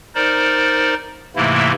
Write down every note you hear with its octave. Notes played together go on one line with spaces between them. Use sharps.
D#4 A#4 C5 D5
G#2 C3 E3 A3 A#3 E4